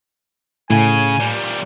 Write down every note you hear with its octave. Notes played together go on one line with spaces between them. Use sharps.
A2 C#3 G#5
A#2 G3